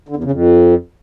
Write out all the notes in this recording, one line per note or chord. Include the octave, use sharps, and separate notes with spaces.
D3
E2
C#3
F2